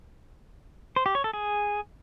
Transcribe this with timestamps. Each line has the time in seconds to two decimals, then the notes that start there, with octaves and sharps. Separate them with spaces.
0.96 C5
1.06 G4
1.15 C#5
1.24 A4
1.33 G#4